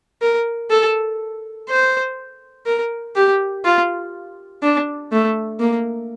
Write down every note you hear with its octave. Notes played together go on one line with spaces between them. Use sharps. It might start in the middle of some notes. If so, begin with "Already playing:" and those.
A#4
A4
C5
A#4
G4
F4
D4
A3
A#3